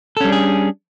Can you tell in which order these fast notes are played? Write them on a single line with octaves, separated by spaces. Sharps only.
A4 C#4 G3 D4 G#4